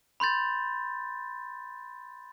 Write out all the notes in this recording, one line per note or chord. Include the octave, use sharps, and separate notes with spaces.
B5 C6 G6 A6